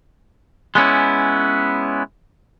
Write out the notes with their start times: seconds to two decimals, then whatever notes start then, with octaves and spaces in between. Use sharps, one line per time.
0.75 G#3 B3 C#4 E4